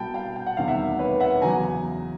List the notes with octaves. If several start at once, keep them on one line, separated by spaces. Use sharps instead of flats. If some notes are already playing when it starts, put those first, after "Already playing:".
Already playing: C2 B2 G3 G5 A5 B5
F5 G5
G5
F#5
E1 D2 C3 D#3 G3 F5
E5 F#5
B4 C#5
E5 F#5
E2 C#3 F#3 G#5 A#5